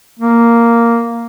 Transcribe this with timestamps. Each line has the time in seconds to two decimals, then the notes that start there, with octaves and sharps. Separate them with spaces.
0.19 A#3